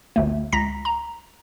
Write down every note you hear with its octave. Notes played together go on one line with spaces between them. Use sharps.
G1 D2 A3
C#2 A#5 A#6 B6
A#5